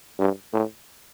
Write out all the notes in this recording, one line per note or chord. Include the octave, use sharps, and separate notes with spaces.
G2
A2